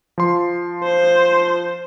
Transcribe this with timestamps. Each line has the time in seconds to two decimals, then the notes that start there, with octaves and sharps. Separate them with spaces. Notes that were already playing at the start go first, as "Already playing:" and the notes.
0.18 F3 C6
0.84 C5